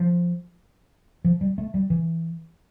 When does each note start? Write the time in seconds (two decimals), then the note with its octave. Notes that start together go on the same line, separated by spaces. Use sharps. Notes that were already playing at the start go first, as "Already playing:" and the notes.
Already playing: F3
1.24 F3
1.41 G3
1.58 A3
1.74 G3
1.90 E3